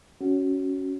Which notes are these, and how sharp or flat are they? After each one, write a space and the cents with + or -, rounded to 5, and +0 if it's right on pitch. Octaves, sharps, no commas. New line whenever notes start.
C#4 +5 F#4 +10